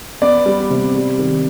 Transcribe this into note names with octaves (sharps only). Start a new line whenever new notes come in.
B3 D5
G3
C3
G3
D#3